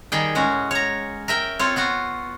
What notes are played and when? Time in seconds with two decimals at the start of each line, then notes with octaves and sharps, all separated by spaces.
0.12 D#3 G3 G#4 G5
0.35 A2 G#3 C#4 F#4
0.71 C#5 A#5
1.28 A#4 E5 G5
1.59 C4 F4 A4 C#5
1.76 B3 F4 F#4